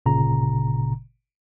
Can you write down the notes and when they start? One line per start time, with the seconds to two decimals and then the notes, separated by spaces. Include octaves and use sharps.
0.06 G1 A#2 C#3 A#5